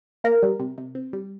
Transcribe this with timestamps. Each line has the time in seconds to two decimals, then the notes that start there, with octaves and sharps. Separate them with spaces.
0.24 A#3 A#4
0.43 G3
0.60 C3
0.78 C3
0.95 C4
1.13 G3